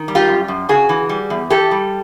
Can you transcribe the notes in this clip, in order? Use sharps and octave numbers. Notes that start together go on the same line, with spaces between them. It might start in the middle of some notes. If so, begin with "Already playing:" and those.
Already playing: D#3
G3
F4 G4
F#2
F#2
C#3 F#4 G#4
E3
G3
E2
E3 G4 A4
G3